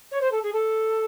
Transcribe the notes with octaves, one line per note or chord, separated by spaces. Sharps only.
C#5
C5
A4
G#4
A4